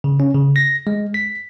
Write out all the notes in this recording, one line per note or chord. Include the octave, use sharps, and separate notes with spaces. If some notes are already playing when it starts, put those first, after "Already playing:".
C#3
C#4
C#3
A#6
G#3
B6